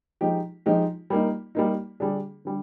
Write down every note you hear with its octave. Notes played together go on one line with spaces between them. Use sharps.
F3 G#3 D#4 G4
F3 G#3 D#4 G4
G3 A#3 D#4
G3 A#3 D#4
D3 G3 D4 G#4
D3 G3